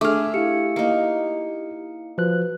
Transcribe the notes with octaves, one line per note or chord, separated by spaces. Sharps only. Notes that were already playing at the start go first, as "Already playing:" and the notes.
A3 D4 G#4 D6 F6
E4 G4 F5 C#7
A#3 D#4
F3 F#4 B4 F#6